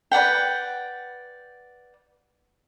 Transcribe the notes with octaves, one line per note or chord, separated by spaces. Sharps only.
B4 D5 F#5 G5